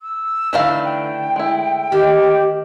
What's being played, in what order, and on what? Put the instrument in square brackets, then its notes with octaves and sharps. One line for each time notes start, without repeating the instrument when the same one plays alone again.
[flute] E6
[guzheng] D3 A3 B4 [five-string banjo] E3 D#4 F5
[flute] G5
[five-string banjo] G#3 E4
[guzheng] D#3 [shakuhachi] G4